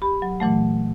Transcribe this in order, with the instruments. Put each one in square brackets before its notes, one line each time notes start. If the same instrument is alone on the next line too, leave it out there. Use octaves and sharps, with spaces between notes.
[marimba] G4 B5
F#3
A#2 E3 F#3 A3